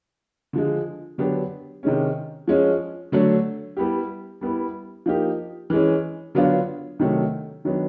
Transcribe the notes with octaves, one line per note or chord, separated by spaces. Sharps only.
D3 F3 G#3
D3 F#3 B3 D4 G4
C3 D#3 G#3 C#4
F3 G#3 C#4
D3 F#3 A3 D4
G3 B3 E4 G4
G3 B3 E4
F3 A#3 D#4 G4
E3 G#3 C#4
D3 F#3 B3 D4 F4
C3 D#3 F#3 A3
D#3 F#3 B3 D4